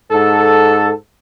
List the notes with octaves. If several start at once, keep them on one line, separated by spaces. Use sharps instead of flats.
G#2 A4